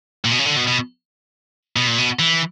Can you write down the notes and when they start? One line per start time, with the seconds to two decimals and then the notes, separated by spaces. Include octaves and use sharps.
0.25 A#2
0.32 B2
0.39 C#3
0.46 D3
0.56 B2
0.67 B2
1.76 B2
1.87 A#2
1.98 B2
2.19 E3